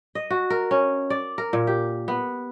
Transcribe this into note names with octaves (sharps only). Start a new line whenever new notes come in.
D#5
F#4
A#4
C#4
D5
A#4
A#2
G4
B3